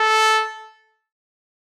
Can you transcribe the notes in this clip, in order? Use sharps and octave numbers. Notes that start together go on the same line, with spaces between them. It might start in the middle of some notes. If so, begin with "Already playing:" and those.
Already playing: A4